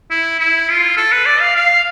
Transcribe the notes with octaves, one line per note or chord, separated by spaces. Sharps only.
E4
E4
F4
A4
B4
D5
F5
F5